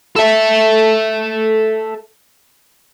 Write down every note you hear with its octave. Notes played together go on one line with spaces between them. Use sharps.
A4 E5